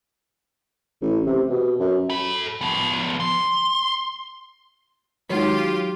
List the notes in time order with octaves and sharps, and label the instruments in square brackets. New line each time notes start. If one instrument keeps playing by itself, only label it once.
[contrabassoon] A1
C3
B2
F#2
[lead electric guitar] A4 B5
F3 B3
C6
[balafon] D#3 G#3 D#4 [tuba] F#3 [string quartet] F4 G4